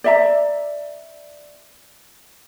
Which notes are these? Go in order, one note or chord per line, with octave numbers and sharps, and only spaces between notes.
D5 E5 A#5